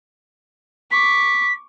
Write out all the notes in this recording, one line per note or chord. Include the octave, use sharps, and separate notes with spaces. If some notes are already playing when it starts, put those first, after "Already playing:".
C#6 D6 B6